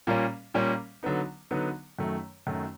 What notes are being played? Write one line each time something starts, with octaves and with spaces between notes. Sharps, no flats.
A#2 G3 A#3 C#4
A#2 G3 A#3 C#4
D3 F#3 B3 D#4
D3 F#3 B3 D#4
F#2 D#3 F#3 A3
F#2 D#3 F#3 A3